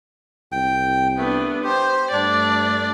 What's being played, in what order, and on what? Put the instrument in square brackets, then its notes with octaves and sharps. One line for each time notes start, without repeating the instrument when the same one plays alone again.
[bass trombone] C2 [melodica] G5
[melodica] A3 [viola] B3 D4
[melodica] G4 [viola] C5
[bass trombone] G2 [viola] A3 D5 [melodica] D4